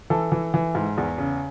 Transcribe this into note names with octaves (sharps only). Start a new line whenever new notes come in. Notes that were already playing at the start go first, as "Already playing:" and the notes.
E3 A4
E3
E3
G#2
E2
C#3